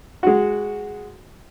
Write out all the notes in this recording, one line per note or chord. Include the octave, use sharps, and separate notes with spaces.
G#3 F#4